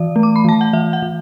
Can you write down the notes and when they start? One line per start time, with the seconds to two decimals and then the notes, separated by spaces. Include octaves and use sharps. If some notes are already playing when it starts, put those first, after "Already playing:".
Already playing: E3 D5
0.16 A3
0.23 D6
0.36 B5
0.45 E3 A5
0.61 F#5
0.73 E3 E5
0.93 F#5
1.03 E3